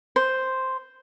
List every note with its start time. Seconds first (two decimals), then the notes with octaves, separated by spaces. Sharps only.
0.16 C5